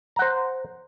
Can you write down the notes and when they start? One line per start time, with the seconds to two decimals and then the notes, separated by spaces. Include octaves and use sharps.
0.16 A#5
0.19 F#5
0.22 C5